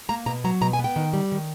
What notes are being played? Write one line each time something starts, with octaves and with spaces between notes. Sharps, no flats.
A#3 A#5
B2 A#5
F#3 A#5
B2 A#5
G#5
B3
G5
D#3
G3
D#3